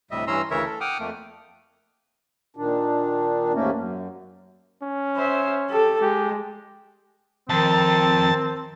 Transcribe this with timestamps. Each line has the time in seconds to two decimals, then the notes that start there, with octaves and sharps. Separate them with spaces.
0.11 D2 A2 C3 G3 D#5 E5
0.27 G2 E3 C#4 A#5 C6 E6
0.51 D2 C#3 E3 A#4 C#5 E5
0.65 A4
0.81 F#5 G5 D6 D#6 F6
0.99 F2 A3 A#3
2.57 A#2 D#3 D4
3.54 D#2 G#2 A3 A#3 C#4
3.73 F#2
4.82 C#4
5.16 C5 E5
5.70 G4 A4
6.01 G#3 G4
7.50 F2 D#3 C4 A5